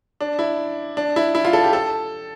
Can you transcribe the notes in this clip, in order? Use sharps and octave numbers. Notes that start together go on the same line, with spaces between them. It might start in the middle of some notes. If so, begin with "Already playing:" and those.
D4
E4
D4
E4
E4
F4
A4
G4
A4